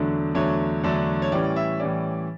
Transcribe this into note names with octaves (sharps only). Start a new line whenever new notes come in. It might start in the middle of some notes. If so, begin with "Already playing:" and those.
Already playing: E2 D3 F#3 A3 D4
E2 D3 F#3 A3 D4 C#5
E2 D3 F#3 A3 D4
C#5
A2 E3 G3 C#4 D5
E5
A2 E3 G3 C#4 D5